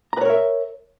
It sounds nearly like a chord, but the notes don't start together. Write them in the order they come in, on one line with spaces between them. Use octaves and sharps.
A#5 B4 C#5 A#4 E5